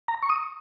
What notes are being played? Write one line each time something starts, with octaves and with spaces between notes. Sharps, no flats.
A#5
C#6
D#6